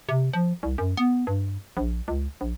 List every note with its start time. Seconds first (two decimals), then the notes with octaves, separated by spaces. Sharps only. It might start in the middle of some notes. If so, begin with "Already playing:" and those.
0.09 C3
0.33 F3
0.63 C2
0.78 F#2
0.97 B3
1.27 G2
1.77 A#1
2.08 C#2
2.41 A#1